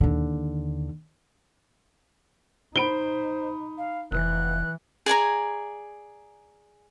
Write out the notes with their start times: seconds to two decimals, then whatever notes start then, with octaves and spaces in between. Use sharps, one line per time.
0.01 D#2 D3
2.76 D#4 C5 B5 D7 G7
3.78 F5
4.12 F1 E3 F#6
5.06 G#4 D5 G#5 A#5